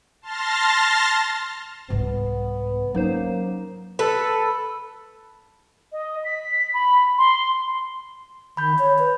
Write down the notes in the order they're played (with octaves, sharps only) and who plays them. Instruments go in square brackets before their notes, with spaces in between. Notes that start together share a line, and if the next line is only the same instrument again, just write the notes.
[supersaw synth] A5 C6 F6 A6 A#6
[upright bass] C2 G#2 [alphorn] B3
[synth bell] F#3 D#4 C5 [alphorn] A#3 [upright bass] C#4
[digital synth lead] A4 [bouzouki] B4
[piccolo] D#5
B6
B5
C6
[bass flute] D#3 [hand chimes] B5 G6
[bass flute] C#5
B4